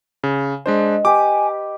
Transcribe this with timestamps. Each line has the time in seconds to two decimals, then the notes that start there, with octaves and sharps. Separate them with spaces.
0.24 C#3
0.66 G#3 D4 C5 D#5
1.05 G4 B4 G#5 D6